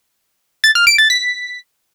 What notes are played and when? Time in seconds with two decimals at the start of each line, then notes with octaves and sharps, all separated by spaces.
0.64 A6
0.75 F6
0.87 D7
0.98 A6
1.10 B6